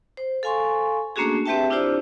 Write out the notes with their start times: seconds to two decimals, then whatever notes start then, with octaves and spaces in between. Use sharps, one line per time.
0.17 C5
0.43 A4 F5 G#5 C6 C#6
1.16 A3 A#3 C#4 D4 F#4 G#4
1.46 C4 G4 B4 E5 G5 A5
1.70 D4 E4 F4 G4 C5 D5